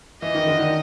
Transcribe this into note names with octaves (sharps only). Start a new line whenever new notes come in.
E3 D#5
D#3
D3
D#3